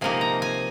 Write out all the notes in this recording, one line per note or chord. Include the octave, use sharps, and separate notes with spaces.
C3 F3 A#3 D#4 G#5
A#5
G#5